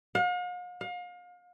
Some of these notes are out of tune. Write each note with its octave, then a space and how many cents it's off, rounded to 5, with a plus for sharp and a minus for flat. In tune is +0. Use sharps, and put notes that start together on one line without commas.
F5 +45
F5 +35